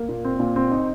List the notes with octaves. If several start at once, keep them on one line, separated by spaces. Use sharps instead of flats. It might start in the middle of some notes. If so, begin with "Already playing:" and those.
Already playing: A#3
A#2
C4
A#2
C4
D#4